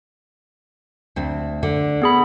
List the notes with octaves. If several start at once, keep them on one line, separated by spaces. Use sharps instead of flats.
D2 C4
D3
B3 G#4 B5